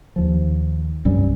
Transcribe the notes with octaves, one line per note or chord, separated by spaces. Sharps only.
D#2 F3
C2 G2 G3 C#4